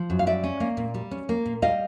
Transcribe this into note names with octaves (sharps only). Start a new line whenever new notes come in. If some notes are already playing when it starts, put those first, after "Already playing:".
Already playing: F3
F#2
F5
G3 D5 E5
C#4
A#3
A#2
G3
C#4
A#3
A#2
G3 D#5 F5